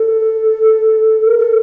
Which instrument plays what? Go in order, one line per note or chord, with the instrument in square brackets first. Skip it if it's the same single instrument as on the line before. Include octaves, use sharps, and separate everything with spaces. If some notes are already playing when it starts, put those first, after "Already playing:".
Already playing: [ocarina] A4
A#4
A4